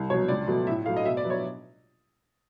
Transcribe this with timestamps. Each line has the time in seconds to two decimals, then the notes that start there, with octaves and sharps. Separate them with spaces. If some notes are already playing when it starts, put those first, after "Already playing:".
Already playing: C2
0.10 B2 C#5
0.14 F#3
0.28 C#2 D5
0.48 B2 F#3 A3
0.67 A2 E5
0.86 F#3 A3 F5
0.97 D#5
1.05 B2 E5
1.17 D5
1.24 F#3 B3
1.30 C#5